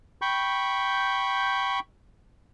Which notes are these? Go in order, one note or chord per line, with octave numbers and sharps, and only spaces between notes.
G5 B5 C#6 G6